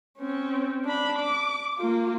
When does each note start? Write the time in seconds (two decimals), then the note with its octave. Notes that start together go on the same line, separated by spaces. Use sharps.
0.18 C4 C#4
0.85 D4 B5
1.19 D6
1.78 A#3 F4